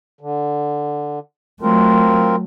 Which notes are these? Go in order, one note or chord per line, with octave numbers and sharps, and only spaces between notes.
D3
F#3 A3 C4 F4 A#4